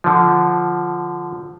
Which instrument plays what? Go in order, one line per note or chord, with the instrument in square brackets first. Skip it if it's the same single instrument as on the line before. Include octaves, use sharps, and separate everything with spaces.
[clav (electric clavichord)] D3 F3